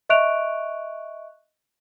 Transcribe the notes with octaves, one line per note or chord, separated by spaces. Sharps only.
D#5 E5 C#6 F#6 D7 F7